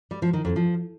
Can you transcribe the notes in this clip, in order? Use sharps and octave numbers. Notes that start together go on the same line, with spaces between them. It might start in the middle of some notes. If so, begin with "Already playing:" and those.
G3
F3
D#3
F2
F3